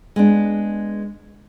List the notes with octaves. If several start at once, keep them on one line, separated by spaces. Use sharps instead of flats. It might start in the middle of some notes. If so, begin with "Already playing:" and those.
G#3 B3 D4